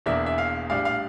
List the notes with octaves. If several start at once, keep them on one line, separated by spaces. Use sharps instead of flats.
E1 E2 E3 A#3 D4 E5
E5
F5
A#1 A2 G3 D4 F5
F5